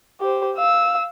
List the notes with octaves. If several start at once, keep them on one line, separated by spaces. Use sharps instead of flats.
G4 C5
F5 E6